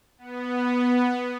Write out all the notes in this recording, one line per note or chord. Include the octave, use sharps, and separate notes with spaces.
B3